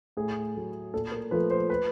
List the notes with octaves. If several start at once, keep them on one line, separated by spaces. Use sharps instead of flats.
A2 G#4
F#3 A3
A#2 A4
A#4
F3 A3 B4
C5
B4